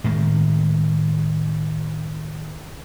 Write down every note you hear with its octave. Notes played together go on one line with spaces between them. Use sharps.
A2 D#3 G#3